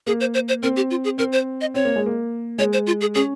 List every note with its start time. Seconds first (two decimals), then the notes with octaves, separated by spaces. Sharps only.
0.07 A#3 G#4
0.20 C5
0.34 C5
0.48 C5
0.63 C4 A#4
0.76 G4
0.91 F4
1.04 G#4
1.18 C4 A#4
1.32 C5
1.61 D#5
1.74 C4 C#5
1.85 A#3
1.96 G#3
2.06 A#3
2.58 G#3 C#5
2.73 C5
2.87 F4
3.01 G#4
3.15 C#4 G#4